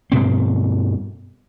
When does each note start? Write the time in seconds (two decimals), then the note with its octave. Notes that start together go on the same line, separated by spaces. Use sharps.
0.12 G2 B2 C4